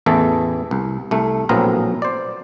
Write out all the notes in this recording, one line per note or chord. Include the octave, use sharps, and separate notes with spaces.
A1 E2 E3 A4
C2
C2 A3
A#1 A2 F#3 B3 C4 A#4
C5 D5